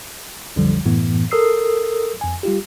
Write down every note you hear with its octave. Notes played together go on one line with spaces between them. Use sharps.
B1 F2 D3 F3 G3
F#2 A2 E3 B3
A4 A#4 D#6 E6 C7
F2 G#5
G3 F4 G4